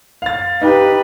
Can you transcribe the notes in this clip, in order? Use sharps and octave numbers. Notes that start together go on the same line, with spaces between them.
F5 A6
D#4 G4 B4